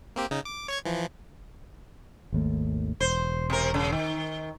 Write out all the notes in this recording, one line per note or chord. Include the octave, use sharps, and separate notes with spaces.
A#3 C4 G4
C#3 D#4
D6
C#5 C#6 G#6
E3 F3
G#1 D#2 A3
E1 C5
C3 A#4
C#3
D#3